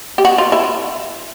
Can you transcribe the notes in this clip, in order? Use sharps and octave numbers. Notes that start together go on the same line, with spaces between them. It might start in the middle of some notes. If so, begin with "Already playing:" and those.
G4
F#4
F4
E4